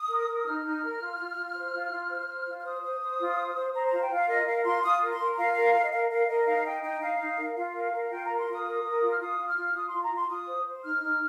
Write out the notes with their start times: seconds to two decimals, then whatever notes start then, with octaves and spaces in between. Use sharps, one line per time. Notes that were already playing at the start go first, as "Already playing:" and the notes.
Already playing: D#6
0.09 A#4
0.27 A#4
0.45 D#4 F6
0.65 D#4
0.83 A#4
1.00 F4
1.19 F4
1.37 F4
1.55 C5
1.73 F4
1.91 F4
2.10 C5
2.28 C5
2.46 F4
2.59 F6
2.64 C5 D#6
2.82 C5
3.01 C5
3.19 F4
3.37 C5
3.55 C5
3.74 C5 A#5
3.86 F4 A#5
4.01 G5
4.10 F4 F5
4.27 A#4 D#5
4.46 A#4 F5
4.64 F4 C6
4.83 F4 D#6
5.00 A#4
5.10 C6
5.19 A#4
5.37 F4 F5
5.55 A#4
5.74 A#4
5.83 D#5
5.92 A#4 F5
6.09 A#4 F5
6.28 A#4 D#5
6.46 D#4 F5
6.64 D#4 G5
6.82 D#4 G5
7.00 D#4 F5
7.19 D#4
7.38 A#4
7.56 F4 F5
7.74 A#4
7.92 A#4
8.10 F4 G5
8.24 A#4 A#5
8.38 C6
8.47 F4 D#6
8.64 A#4
8.83 A#4
9.01 F4
9.11 F6
9.20 F4 D#6
9.38 F4
9.46 F6
9.55 F4
9.74 F4 D#6
9.87 C6
9.93 F4
10.02 A#5
10.10 F4 C6
10.29 F4 D#6
10.47 C5
10.65 C5
10.83 D#4 F6
11.02 D#4